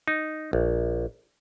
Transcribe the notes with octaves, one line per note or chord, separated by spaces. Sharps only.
D#4
A#1